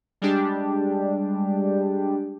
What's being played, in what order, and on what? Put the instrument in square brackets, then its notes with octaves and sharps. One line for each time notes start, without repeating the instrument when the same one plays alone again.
[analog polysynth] G3 G#3 D4 G4